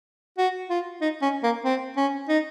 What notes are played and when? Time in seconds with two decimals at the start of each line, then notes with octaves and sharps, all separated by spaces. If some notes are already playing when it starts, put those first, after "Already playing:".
0.38 F#4
0.70 F4
1.02 D#4
1.22 C#4
1.43 A#3
1.65 C4
1.97 C#4
2.28 D#4